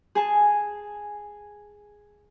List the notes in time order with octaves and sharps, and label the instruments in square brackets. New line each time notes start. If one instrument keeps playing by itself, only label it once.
[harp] G#4 G#5 A5